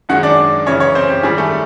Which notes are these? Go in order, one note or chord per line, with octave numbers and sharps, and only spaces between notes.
F#2 D#3 G#3 F#4 F#5
D4 D5
F#2 C#3 E3 C#4 C#5
C#4 C#5
C4 C5
G4
G#2 D#3 G3 G#4
A3 A4